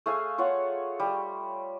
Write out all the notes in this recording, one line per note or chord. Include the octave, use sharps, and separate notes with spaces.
A3 G#4 F5 G#5
F4 C#5 F#5
G3